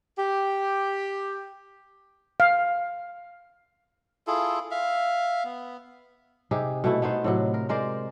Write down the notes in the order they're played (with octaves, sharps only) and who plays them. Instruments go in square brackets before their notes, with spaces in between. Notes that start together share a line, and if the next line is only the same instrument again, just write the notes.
[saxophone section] G4
[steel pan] F5
[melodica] E4 F4 G#4 A4
E5 F5
B3
[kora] C3 D#4 G4 G#4
B2 A3 E4
A3 B3 D#4 C5
A2 C3 F#3
A#4
G#3 A#4 C5 D5